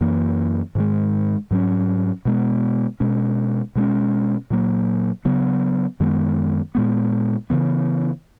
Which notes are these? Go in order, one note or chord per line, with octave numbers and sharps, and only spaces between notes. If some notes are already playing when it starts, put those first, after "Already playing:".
F#2 E3 A#3
G#2 D#3 G#3
G#2 F#3 C#4
B2 G#3 B3
B2 G#3 C#4
B2 G#3 C#4
A#2 F#3 A#3
C#3 F#3 B3
F#2 D#3 G#3 B3
A#2 G#3 B3
C#3 E3 B3